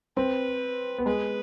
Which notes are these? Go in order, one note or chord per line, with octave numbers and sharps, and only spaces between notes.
C4 B4
B3
G#3 B4